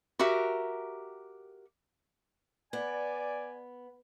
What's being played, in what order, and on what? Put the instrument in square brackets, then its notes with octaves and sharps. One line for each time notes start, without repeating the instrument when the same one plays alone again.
[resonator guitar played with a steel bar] F#4 G4 A#4 E5
[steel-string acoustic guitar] B3 [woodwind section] D5 G#5